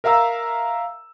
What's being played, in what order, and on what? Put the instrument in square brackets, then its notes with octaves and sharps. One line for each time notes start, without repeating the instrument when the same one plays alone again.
[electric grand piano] A#4 E5 F5 A#5 E6